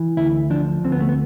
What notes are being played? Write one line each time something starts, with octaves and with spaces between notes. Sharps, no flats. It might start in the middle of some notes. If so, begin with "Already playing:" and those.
Already playing: E3
D2 E4
F3 D4
D2 C4
B3
A3
B3